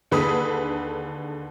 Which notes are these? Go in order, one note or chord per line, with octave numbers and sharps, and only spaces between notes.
D#2 D3 G#4 B4 D#6 B6